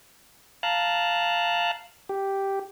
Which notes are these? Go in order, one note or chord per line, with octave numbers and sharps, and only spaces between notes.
F5 A5 A#5 F#6
G4